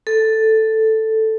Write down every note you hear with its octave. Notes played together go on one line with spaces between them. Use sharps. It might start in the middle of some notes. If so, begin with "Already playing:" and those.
A4